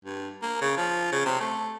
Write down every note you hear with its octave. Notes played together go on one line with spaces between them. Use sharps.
G2
A#3
C#3
F3
C#3
C3
A3